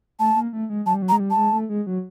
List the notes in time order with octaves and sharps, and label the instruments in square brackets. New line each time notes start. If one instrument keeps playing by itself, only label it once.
[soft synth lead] A3 [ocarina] A5
[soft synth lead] A#3
A3
G#3
[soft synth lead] F#3 [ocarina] A5
[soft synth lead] G3
F#3
[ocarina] A#5
[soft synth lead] G#3
G3
[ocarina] A5
[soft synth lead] G#3
A3
G#3
F#3